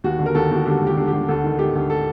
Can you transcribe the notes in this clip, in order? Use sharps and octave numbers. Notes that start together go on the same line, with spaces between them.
D#2 F#4
D3
A#4
D#2 A4
D#2 F#4
D3 G4
D#2
G4
D3
G4
D3
D2 A4
D#3
D#3 G4
D2
A4